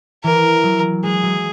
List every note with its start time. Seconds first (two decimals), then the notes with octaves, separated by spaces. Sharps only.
0.24 E3 A#4
0.63 F#3
1.03 G#3 G#4
1.23 F#3